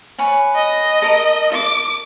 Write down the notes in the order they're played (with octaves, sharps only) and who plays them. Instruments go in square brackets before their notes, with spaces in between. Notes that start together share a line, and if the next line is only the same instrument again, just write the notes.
[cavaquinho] B4 C#5 G#5
[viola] D#5
[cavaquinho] A4 A#4
[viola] D6